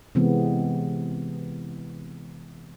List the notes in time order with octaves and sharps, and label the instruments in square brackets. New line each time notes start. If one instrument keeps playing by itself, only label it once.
[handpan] C3 E3 G#3 B3 C4